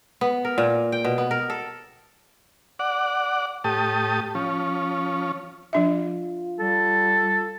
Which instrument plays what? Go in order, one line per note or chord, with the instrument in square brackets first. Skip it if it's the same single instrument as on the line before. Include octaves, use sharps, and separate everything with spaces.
[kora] B3
A#4
A#2
G5
B2
B3
A#4
A4
[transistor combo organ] D5 F#5
A2 G4 A5 D#6
F3 C#4
[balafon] F3 D4 E5 [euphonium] F4
[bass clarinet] G3 [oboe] A4